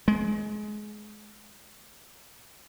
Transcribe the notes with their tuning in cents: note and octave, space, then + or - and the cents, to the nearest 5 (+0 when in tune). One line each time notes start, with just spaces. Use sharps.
G#3 +25